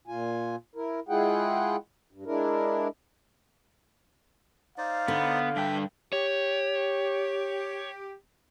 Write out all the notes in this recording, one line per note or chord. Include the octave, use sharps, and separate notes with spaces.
A#2 F4 G#5
E4 A#4
G#3 E4 F4 G#4 F#5 G5
G2
G#3 D4 E4 A#4
D#4 C5 D5 F5
D3 B3
G2 D4 E5 G5
G4 C#5